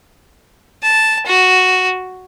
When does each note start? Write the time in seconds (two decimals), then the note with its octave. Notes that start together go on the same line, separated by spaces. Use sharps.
0.82 A5
1.26 F#4